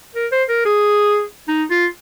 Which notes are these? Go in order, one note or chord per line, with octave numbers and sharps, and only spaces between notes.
A#4
C5
A#4
G#4
D#4
F4